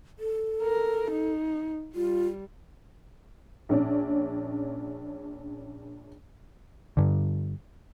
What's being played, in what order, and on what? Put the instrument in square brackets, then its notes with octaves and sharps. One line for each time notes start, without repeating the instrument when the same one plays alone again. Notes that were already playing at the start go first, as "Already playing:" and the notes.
[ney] A4
[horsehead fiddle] A#4
D#4
[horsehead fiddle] G3 [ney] F4
[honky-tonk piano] A#1 C#4 D4
[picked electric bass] G2 D3